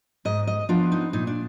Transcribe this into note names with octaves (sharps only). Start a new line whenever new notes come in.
G#2 D#5
D#5
F3 B3 D4 F4
D#4
A#2 D#4
D4